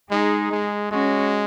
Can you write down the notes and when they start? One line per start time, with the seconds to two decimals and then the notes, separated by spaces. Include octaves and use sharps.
0.11 G#3 D#4 G#4
0.51 G#3
0.91 G#3 C#4 F#4